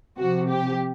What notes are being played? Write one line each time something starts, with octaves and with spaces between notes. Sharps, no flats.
C3 F3 F#4
G4